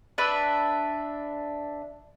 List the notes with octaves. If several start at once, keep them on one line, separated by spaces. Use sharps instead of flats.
D4 B4 E5